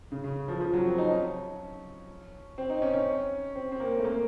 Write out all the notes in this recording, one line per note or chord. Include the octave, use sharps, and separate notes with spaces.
C#3
C#3
F3
F3
F#3
C4
D#4
C#4
C4
D#4
C#4
C#4
C4
C4
A#3
A3
A#3